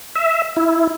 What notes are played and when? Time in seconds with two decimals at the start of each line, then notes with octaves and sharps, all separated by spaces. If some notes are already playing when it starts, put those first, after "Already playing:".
0.16 E5
0.57 E4